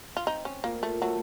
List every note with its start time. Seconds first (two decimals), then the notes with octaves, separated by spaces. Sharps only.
0.17 F4
0.26 C4 D#4
0.45 C#4
0.64 A#2 A#3
0.83 A3
1.01 F#3 A3